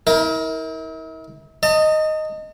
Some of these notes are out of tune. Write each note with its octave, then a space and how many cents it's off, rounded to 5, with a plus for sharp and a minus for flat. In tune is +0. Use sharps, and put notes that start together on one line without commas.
E4 -45 A#4 +0
D#5 +0 A5 +45